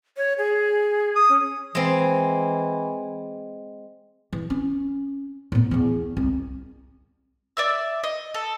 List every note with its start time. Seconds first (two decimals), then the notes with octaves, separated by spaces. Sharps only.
0.17 C#5
0.38 G#4
1.15 D#6
1.29 C#4
1.75 E3 G#3 C4
4.33 E3
4.50 C#4
5.52 A2 B3
5.71 E2 E4
6.17 C2
7.57 D5 E5 E6
8.04 D#5
8.34 A4